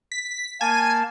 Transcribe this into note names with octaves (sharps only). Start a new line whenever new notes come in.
B6
A#3 G#5 A5